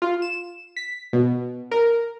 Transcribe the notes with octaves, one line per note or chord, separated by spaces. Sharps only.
F4
E7
B6
B2
A#4